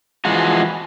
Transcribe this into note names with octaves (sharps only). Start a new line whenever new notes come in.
E3 F3 G#3 F4 F#4